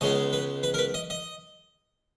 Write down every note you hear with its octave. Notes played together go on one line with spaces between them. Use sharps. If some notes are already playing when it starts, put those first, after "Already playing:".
C#2 C#3 G#3 B3 D#5
B4
B4
A#4
B4
D#5
D#5